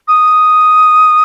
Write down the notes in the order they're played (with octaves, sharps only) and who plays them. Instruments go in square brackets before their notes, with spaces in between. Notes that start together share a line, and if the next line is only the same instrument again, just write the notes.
[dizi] D#6